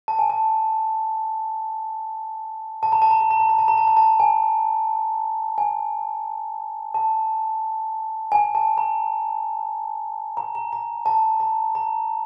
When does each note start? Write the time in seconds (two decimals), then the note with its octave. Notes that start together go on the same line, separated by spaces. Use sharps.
0.08 A5
0.19 G#5
0.30 A5
2.83 A5
2.92 A#5
3.02 A5
3.11 A#5
3.21 A5
3.31 A#5
3.40 A5
3.49 A#5
3.59 A5
3.68 A#5
3.78 A5
3.88 A#5
3.97 A5
4.20 G#5
5.58 G#5
6.94 A5
8.32 G#5
8.55 A5
8.78 A#5
10.37 A#5
10.55 A#5
10.73 A#5
11.06 A5
11.40 A#5
11.75 A#5